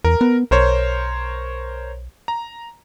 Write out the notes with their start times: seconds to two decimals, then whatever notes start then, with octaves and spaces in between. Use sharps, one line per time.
0.05 E2 A#4
0.21 B3
0.51 B1 A#4 C5 C#5
2.28 A#5